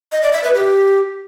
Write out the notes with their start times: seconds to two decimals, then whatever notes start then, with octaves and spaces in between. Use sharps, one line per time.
0.12 D#5
0.23 D5
0.33 E5
0.44 B4
0.54 G4